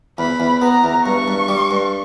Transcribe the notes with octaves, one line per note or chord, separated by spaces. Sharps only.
E2 B5
E2
B3 A#5
E2
G2 C#6
G2
G3
G2